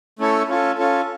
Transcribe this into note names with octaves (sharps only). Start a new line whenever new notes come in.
A3 C#4 E4 A4 C#5
C#4 F4 A4
C#4 F4 A4